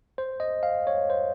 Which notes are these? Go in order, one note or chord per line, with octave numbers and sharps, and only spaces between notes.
C5
D#5
F5
C#5
C5